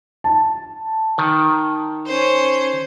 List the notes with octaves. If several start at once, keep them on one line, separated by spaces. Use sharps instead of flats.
A5
D#3
C#4 C5